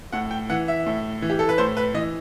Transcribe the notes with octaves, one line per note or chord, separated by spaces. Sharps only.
A2 F#5
G5
E3 F#5
E5
A2
E3
G4
A4
B4
A2 C5
B4
E3 D#5